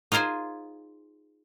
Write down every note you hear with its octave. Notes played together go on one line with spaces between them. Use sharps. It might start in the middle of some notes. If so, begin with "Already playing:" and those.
D#4 F4 G#4 C5 G#5